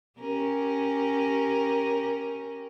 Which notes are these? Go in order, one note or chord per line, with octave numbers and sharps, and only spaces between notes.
C#4 G4 A#4